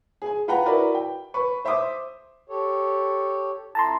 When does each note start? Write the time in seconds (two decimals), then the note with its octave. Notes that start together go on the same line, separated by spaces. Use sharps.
0.22 G#4 G#5
0.48 F4 B4 F#5 G5 A#5
0.66 E4 F#4 A#4 B4 D5
0.95 G5
1.34 B4 C#6
1.65 C5 E5 C6 D6 D#6
2.48 G4 A4 C#5
3.75 F2 E4 A4 A5 A#5 C6